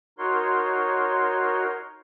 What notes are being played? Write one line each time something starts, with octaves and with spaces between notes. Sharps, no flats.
D#4 F#4 A#4 C#5 C6